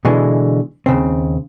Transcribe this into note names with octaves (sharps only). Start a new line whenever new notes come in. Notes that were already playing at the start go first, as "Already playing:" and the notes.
B2 D3 E3 G#3
D#2 C#3 C4